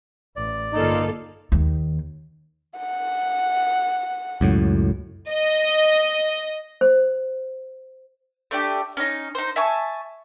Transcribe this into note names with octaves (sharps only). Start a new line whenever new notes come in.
A1 D5
G2 D3 A#3 D#4 F4 A4
D#2
F#5
C#2 F#2 A2
D#5
C5
A3 D4 G4
C#4 D#4
D#4 C5
E5 G#5 A5 C#6